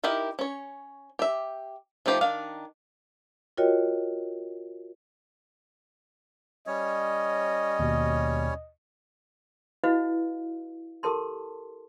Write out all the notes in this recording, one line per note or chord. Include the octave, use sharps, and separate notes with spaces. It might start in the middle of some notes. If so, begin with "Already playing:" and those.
D#4 E4 G4 A#4 D#5
C#4 C#5
G4 E5
F3 A3 D#4 G4 C5
D#3 D4 D#4 F5
F4 F#4 A#4 C#5 D#5 G5
G3 C#4 C#5 D#5
D#2 B2
E4 F#4 B4 D#5 F5
G4 A4 A#4 A5 C6